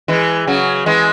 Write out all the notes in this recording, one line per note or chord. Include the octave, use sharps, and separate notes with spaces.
E3 G#3
C#3 F#3
E3 G#3